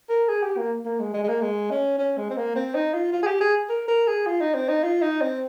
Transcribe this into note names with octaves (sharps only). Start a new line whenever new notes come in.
A#4
G#4
G4
A#3
A#3
G#3
G#3
G#3
A#3
G#3
C#4
C#4
G#3
C4
A#3
C4
D#4
F4
F4
G#4
G4
G#4
A#4
A#4
G#4
F4
D#4
C4
D#4
F4
D#4
C4